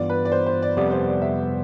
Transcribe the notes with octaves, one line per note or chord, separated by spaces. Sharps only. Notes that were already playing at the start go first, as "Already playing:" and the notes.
Already playing: G2 E3 B3 F4 D5
B4
D5
C5
C5
D5
F2 C3 G3 B3 D5
C5
D5
E5